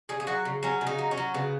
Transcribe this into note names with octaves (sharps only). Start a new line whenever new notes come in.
C#3 G#4
G#4
F#3 F#4
C#3
F#3 C#4
C#3
D#4
F#3
C#4
F#3
C#3 B3